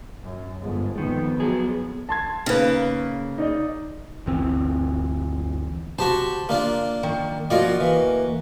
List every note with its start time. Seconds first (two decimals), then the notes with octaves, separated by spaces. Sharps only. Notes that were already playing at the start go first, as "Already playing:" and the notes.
0.23 F#2
0.60 G1 G#2
0.98 F2 D#3 B3
1.40 F#3 G#4
2.09 A5 C6 G#6
2.46 C#3 A#3 D#4 B4
3.38 D#4 D5 D#5
4.26 G1 D2 E3 C4
5.99 F#4 G4 C5 A5
6.49 A#3 D4 F4
7.03 D#3
7.50 F3 A#3 F4 F#4 D5 D#5
7.81 E3